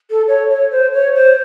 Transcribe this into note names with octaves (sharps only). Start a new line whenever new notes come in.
A4
C#5
C#5
C5
C#5
C5